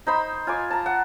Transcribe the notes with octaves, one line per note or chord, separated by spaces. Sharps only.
D#4 C5 B5
F4 G#5 D6
A5 A#5
F#5